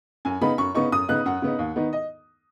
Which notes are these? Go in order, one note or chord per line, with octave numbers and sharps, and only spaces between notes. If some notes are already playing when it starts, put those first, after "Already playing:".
F#2 G#5
C#3 B3 D#4 B5
F#2 C#6
C#3 B3 D#4 C#6
F#2 D#6
C#3 B3 D#4 F#6
F#2 F#5
C#3 B3 D#4
D#2
D#3 B3 D#4
D#5